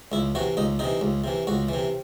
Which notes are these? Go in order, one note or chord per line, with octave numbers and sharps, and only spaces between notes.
C#2 E4
C3 E3 F#4
C#2 D#4
C3 E3 D#4
C#2
C3 E3
C#2 F#4
C3 E3